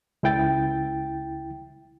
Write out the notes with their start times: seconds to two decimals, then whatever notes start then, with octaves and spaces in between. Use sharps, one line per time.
0.23 C#2 E4 G5 A6